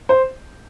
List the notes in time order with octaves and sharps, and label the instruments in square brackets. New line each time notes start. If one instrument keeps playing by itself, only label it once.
[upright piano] C5